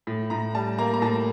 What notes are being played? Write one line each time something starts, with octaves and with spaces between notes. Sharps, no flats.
A2
A2 A#5
G3 A5
A#3 A#5
A#5
A2 A5